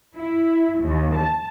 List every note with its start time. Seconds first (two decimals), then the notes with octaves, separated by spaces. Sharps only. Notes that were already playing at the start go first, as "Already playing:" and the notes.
0.16 E4
0.79 D#2
1.16 A5